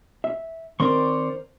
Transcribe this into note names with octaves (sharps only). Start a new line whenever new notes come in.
E5
D#3 C4 A#4 C5 D5 C6 C#6